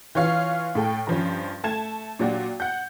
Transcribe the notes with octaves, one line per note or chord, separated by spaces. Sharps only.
E3 F4 C#5 F5 F6
A2 A4 G5
G2 F3 C#4
A3 A5 G#6 E7
A#2 F#3 D4 F#4 G4
F#5 G6